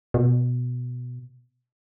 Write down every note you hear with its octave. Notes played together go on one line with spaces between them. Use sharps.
B2